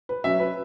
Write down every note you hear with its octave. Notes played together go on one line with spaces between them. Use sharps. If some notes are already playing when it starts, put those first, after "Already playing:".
B4
F#3 C#4 E5
B4